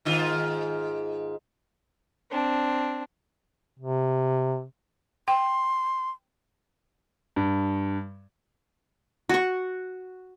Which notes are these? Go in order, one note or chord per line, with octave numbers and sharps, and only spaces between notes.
G#2 D#3 F4
C4 D4
C3
G5 C6
G2
F#4 C#6